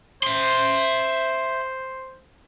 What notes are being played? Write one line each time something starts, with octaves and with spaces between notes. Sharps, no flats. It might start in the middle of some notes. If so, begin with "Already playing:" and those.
C5 E5 C6